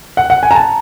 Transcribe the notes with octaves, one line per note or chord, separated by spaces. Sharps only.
F#5
F#5
G#5
A#5
A5